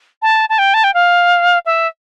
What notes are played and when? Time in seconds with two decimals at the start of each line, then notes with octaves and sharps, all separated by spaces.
0.22 A5
0.49 A5
0.59 G5
0.74 A5
0.84 G5
0.94 F5
1.66 E5